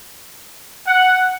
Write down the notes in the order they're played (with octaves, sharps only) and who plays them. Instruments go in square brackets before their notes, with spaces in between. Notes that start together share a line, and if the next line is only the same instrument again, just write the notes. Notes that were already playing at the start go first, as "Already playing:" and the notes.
[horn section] F#5